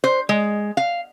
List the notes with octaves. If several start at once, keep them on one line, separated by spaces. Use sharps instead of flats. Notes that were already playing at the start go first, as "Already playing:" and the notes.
C5
G#3
F5